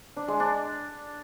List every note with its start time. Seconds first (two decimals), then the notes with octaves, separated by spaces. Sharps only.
0.17 D4
0.28 G#3
0.40 D4